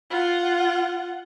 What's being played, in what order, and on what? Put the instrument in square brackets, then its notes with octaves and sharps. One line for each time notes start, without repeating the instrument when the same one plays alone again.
[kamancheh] F4 F#5